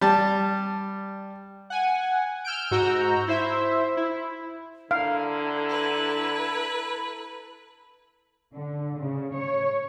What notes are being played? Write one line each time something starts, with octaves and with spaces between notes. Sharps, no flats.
G3 A5
F#5 G#5
E6 F6 G6 D7
G#2 F#4 A#5 E6 G6
E4 C5 E5
E4
D3 E4 A4 F5 A#5
B4
D3
C#3
C#5